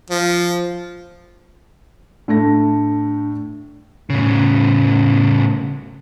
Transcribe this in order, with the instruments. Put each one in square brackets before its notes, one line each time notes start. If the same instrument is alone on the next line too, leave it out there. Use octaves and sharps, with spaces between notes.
[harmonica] F3
[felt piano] A2 A3 A#6 [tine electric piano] D4
[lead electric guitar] A2 C#3